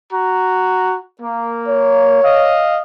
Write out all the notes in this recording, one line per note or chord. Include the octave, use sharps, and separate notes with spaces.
F#4 A#5
A#3
C#5
D#5 F5